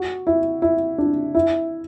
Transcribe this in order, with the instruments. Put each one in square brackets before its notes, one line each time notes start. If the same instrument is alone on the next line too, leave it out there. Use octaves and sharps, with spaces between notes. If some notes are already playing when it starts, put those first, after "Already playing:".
Already playing: [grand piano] F#4
E4
E4
D4
E4